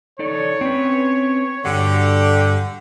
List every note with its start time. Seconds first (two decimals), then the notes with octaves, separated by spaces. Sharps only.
0.19 D#4 A4 C#5 D5
0.61 C4 C#4 B4
1.65 G2 D3 F#4 G4